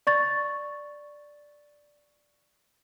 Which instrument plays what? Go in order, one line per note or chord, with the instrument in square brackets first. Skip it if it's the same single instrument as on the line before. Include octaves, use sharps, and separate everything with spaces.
[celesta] D5 C#6 A6